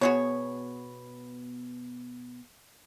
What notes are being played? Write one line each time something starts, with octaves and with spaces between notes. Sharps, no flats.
B2 B3 F#4 G#4 C#5